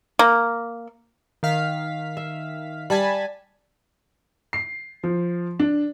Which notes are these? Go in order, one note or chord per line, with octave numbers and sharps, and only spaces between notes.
A#3
D#3 F5 B6
E5
G3 G#5 A5 B5
C7
F3
D4